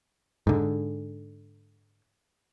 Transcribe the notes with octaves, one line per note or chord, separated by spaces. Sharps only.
G#2 D3